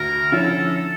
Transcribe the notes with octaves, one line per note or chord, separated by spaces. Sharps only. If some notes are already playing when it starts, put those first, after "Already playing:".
Already playing: D2 A#4
D3 F3 C#4 E4 A4
A4